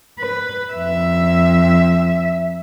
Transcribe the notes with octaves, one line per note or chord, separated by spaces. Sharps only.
B4
F2 E5